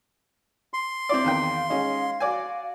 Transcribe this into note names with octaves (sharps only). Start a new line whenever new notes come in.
C6
C4 E4 D5
E2 D#3 F5 G5
G#3 C#4 D#4
F#4 D5 G#5